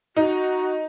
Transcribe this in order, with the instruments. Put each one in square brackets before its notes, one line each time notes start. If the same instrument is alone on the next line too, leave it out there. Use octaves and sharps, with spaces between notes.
[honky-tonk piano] D#4 [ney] F#4